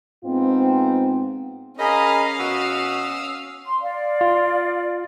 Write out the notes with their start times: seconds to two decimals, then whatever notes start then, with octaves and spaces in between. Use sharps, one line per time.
0.25 G#2 B3 C4 F4
1.79 C#4 G#4 A#4 D#5 F5 B5
2.39 B2 F#4 D#6 E6
3.67 C6
3.81 D5 F5
4.21 F4